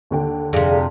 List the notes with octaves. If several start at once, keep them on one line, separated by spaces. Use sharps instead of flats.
D#2 D3 G5
F2 C3 G#4 D5 F5